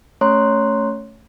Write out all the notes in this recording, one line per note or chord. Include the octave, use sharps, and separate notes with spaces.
A3 C#4 C#5 A#5 C6 F#6